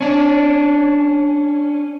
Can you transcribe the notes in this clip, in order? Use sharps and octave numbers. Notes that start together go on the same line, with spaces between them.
C#4 D4